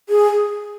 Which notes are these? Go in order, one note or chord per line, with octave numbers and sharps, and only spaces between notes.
G#4